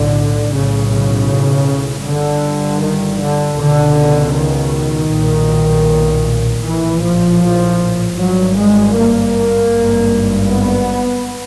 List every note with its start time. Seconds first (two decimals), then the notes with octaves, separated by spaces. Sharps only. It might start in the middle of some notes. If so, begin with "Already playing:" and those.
Already playing: B1 A2 D3
0.53 B1 A2 C#3
0.91 C#3
2.06 G1 G2 D3
2.83 D#3
3.22 D3
3.59 C#2 B2 D3
4.36 D#3
5.13 B1 A#2
6.66 A#1 A2 E3
7.04 F3
8.19 G#1 G2 F#3
8.57 G#3
8.96 A#3
9.72 G#1 G2
10.49 B3